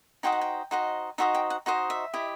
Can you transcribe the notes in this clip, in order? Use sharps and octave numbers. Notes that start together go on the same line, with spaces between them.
D#4 F#4 C5 D#5 G5
F#5
G5
D#4 F#4 C5 D#5
D#4 F#4 C5 D#5 E5
G5
F#5
D#4 F#4 C5 D#5
E5
E4 G4 D#5